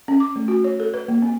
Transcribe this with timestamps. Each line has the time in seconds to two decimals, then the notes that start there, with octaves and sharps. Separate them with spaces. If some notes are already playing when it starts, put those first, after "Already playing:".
0.08 C#4
0.20 D6
0.36 A3
0.48 F#4
0.64 C#5
0.80 A4
0.94 B4
1.08 A#3
1.22 C4